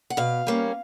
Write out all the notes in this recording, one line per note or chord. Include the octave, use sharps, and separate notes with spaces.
F#5
B2 F5
G3 A#3 C#4